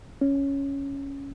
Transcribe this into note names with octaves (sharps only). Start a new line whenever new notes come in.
C#4